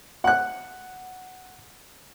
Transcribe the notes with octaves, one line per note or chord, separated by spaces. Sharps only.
F#5 F#6